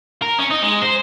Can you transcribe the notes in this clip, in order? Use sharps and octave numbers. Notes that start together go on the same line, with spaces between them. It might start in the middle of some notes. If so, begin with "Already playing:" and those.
A#4
C#4
D#4
G#3
C5